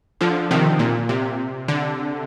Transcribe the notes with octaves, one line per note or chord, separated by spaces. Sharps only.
D3 F3
C3 D#3
A#2
C3
D3